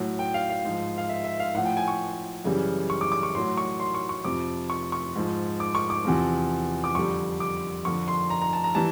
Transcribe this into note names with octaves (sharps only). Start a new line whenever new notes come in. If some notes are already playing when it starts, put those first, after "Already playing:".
Already playing: A2 F#3
G5
F5
F5
G#2 F3
F5
E5
E5
F5
A2 F3 F#5
G5
G#5
C#6
F#2 C#3 E3 G3
C#6
D6
D6
C#6
A2 F#3 C6
C#6
C6
C#6
C#6
F2 C3 F3 D6
C#6
C#6
G#2 F3
D6
C#6
D6
E2 C3 F3
D6
F2 D3 G3 C#6
D6
F2 D3 F3 C#6
C6
A#5
A#5
A5
A#5
E3 G3 A5